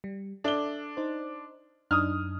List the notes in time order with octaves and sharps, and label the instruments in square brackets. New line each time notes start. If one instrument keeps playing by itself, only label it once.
[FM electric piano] G3
[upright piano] D4 G7 [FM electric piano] A4 E5
[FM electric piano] D#4 C5
[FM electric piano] F#2 D4 D#4 [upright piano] D#6 F6